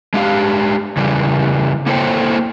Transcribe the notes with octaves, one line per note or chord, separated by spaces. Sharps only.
G#3 D4 G4 F5
C#3 E3 G3
A#3 E4 A4 C5 C#5 G5